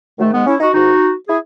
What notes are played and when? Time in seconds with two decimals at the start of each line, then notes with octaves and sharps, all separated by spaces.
0.19 G#2 D#3 F#3 A3
0.33 G#3 B3
0.46 C#4 E4
0.60 D#4 F#4
0.73 G#2 D#3 D#4 F#4
1.28 E4 G#4